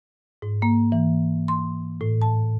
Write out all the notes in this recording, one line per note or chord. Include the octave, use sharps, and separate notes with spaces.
G#2
A#3
E3
C6
A2
A5